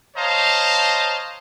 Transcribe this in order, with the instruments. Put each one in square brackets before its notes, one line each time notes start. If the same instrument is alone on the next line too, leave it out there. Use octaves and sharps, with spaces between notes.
[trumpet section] C5 C#5 D#5 F5 A5 A#5